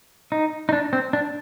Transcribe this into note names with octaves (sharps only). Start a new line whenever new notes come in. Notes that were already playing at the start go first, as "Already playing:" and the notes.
D#4
D#4
D4
C4
D4